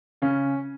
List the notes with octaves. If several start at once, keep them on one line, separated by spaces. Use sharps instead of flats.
C#3 C#4